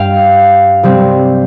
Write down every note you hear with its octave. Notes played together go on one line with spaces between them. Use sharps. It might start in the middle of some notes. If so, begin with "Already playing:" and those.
Already playing: G2 G3 F5 G5
C3 G3 C4